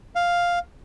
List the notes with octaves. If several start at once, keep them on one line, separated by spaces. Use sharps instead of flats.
F5